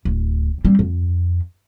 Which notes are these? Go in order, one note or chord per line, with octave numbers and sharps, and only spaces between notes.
D1
G3 C4
F2